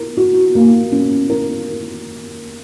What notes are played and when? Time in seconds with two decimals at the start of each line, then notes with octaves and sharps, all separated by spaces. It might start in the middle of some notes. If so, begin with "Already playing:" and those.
Already playing: A#4
0.17 F#4
0.55 A#3
0.92 C#4
1.30 A#4